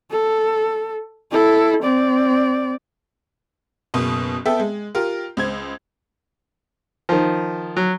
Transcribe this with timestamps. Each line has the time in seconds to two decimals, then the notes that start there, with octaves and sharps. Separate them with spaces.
0.11 A4
1.32 E4 A4
1.83 C4 D5
3.94 F#1 B2 D#6
4.46 B3 A4 E5 G5
4.60 G#3
4.95 F4 G4 A#4
5.37 C#2 C5 G#6
7.09 D#3 F3
7.77 F#3